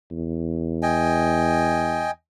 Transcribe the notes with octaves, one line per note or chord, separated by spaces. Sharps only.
E2
D#5 G5 G#5